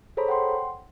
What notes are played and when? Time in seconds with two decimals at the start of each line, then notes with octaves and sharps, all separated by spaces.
0.17 G#4 A4 C5 C#5 A#5 B5
0.28 F#5 G5 C6